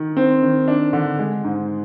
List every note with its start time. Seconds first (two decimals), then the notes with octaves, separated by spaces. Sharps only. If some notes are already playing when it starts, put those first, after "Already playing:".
Already playing: D#3
0.17 C4
0.43 D#3
0.68 D4
0.93 D3
1.19 G#3
1.44 G#2